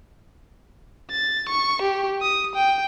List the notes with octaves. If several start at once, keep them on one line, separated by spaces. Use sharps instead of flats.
A6
C#6
G4
D#6
G5